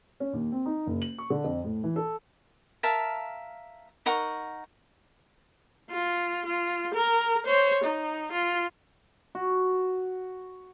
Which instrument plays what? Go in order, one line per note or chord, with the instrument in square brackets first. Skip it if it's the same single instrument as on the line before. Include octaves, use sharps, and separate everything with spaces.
[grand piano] C#4
D#2
C4
D#4
F#1
F#7
C#6
D3
F2
A2
E3
A4
[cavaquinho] A#4 E5 F5 A5
D#4 A#4 F#5 C#6
[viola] F4
F4
A#4
C5 C#5
D#4
F4
[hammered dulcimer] F#4